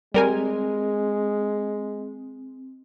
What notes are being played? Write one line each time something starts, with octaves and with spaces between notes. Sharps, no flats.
G3 G#3 C4 A#4 G#5